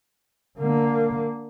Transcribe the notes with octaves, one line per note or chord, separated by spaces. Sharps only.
D3 A#3